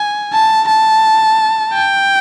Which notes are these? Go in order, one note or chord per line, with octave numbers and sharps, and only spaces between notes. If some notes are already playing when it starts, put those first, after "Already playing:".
Already playing: G#5
A5
A5
G5